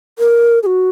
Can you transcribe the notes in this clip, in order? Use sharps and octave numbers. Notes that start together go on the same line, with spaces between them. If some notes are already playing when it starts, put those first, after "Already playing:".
A#4
G#4
F#4